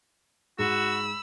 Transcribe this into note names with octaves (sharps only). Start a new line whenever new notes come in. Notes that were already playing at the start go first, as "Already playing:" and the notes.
G#2 F#4 B5 E6